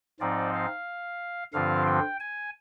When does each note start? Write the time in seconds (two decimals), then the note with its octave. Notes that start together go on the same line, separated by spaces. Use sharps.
0.20 G#2 F3 C4 D#4 D5
0.54 F5
1.53 G2 D3 F3 C4 F4 F5
1.87 G5
2.20 G#5